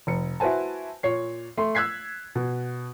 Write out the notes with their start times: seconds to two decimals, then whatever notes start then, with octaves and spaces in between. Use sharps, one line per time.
0.07 F1 C#7
0.40 E4 F#4 B4 C5 G#5 A5
1.03 A#2 C#5 C7
1.57 A3 C6
1.75 E6 F#6 G#6 B6 C7
2.35 B2